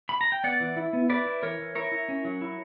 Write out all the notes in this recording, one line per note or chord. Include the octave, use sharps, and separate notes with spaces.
B5
A#5
G5
B3 D5 F#5
E3
E4
B3
E4 B4 D5
E4
E3 A#4 C#5
E3
E4 A#4 C#5
E4
C#4
F#3
E4